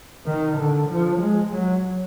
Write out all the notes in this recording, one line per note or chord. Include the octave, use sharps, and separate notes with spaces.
D#3
D3
F3
G#3
F#3